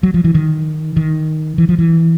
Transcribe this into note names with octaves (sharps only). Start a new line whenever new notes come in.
F#3
F3
E3
D#3
D#3
E3
F3
E3